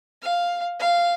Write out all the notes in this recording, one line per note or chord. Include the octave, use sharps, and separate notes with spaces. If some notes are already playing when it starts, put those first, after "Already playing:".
F5
F5